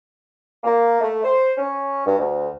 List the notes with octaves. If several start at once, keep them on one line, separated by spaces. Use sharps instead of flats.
A#3
A3
C5
C#4
G2
D2